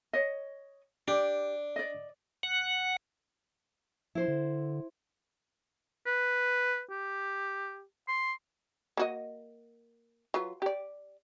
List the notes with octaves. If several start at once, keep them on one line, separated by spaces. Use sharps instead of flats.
C#5 D#5
D4 G4
D5 D#5
F#5
F3 E4 C5
D3
B4
G4
C6
A#3 F#4 D#5
F#3 F4 B4
G4 D5